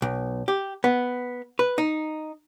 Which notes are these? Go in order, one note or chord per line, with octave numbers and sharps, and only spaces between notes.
B1
G4
B3
B4
D#4